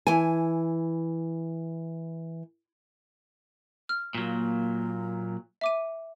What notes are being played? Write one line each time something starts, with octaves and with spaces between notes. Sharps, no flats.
E3 G#5
F6
A#2 F#3 A#3
E5 D6 D#7